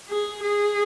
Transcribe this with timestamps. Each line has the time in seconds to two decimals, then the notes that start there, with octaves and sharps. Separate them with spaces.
0.10 G#4
0.43 G#4